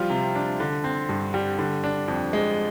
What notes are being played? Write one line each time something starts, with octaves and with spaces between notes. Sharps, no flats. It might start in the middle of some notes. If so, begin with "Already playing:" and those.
Already playing: F3 G3 F4
C3
D4
D3
C4
G2
G3
D3
D4
F2
G#3